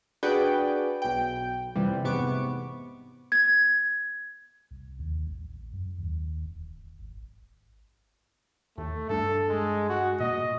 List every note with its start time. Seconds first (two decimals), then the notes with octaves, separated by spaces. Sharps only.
0.23 D4 F#4 G#4 B4 D5 G5
1.02 B1 G5
1.76 F2 C3 E3 G3
2.04 A1 G#2 C3 B3 C#6 D6
3.32 G#6
4.71 C2
4.99 D#2
5.27 A1
5.73 F#2
5.98 D#2
6.45 D1
6.99 G#1
8.78 D#2 A3
9.09 G2 D4 A4
9.49 G#3
9.89 F#4
10.20 A#2 D#5